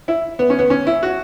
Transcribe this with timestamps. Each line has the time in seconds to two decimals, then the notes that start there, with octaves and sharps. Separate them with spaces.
0.08 E4
0.39 B3
0.50 C#4
0.59 B3
0.70 C#4
0.87 E4
1.03 F#4